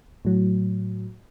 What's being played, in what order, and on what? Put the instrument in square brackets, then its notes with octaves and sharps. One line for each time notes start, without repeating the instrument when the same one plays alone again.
[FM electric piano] A2 F#3